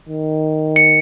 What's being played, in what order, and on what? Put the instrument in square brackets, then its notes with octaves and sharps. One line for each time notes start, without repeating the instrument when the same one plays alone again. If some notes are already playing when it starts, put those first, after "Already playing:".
[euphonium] D#3
[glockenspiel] C#7